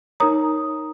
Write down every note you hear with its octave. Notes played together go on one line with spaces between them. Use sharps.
D#4 A#4 C#5 A#5 D#6